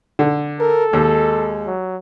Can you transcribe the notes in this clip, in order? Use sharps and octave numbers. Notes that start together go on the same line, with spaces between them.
D3
A4 A#4
D#2 G#3
F#3